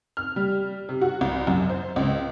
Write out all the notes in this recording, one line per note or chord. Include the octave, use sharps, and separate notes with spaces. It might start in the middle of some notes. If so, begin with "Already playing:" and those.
F6
G3
C3
F#4
C2
F#2
C5
C#2